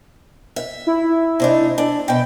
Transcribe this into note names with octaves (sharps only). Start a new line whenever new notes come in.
E5
E4
C3 D4 D#4
D4
B2 E5 G5